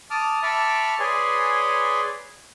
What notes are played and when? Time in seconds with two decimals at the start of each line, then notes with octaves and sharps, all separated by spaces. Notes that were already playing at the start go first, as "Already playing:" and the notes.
0.10 A5 D6 D#6 F6
0.43 E5 A5 B5 C#6 D6 F6
1.00 G#4 B4 C#5 D5 G#5 C6